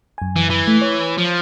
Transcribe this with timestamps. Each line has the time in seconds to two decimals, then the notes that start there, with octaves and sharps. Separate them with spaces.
0.18 F#2 G#5
0.36 E3
0.50 E3
0.68 A3
0.82 C#5
1.18 F3